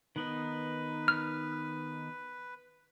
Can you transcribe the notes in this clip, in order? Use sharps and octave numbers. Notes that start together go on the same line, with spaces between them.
D#3 B3 D#4 B4
F6